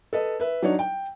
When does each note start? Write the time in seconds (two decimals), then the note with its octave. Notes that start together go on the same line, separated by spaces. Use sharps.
0.13 A4 B4 D#5
0.40 B4 E5
0.62 F#3 D4 D#4 C#5
0.79 G5